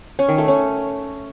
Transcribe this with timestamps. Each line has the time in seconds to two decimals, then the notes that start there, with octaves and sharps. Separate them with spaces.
0.19 C#4
0.29 D#3
0.38 A3
0.48 C#4